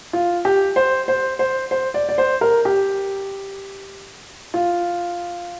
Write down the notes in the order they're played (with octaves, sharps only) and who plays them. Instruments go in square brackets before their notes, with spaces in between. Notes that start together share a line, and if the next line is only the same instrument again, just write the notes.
[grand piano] F4
G4
C5
C5
C5
C5
D5
D5
C5
A#4
G4
F4